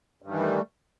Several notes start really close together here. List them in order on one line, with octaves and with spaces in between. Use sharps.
G2 D#3 E3 G3 A3